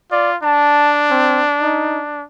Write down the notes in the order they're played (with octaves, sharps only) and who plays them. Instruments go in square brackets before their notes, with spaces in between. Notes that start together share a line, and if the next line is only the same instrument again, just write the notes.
[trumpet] F4 [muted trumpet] D5
[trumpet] D4 [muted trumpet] A5
[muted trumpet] C4
D#4